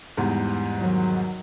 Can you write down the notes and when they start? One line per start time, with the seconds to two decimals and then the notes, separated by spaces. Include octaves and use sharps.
0.17 E2 G#2 G3
0.77 D#3 F#3